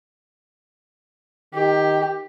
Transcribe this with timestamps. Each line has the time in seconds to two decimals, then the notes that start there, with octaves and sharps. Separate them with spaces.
1.54 D#3 G4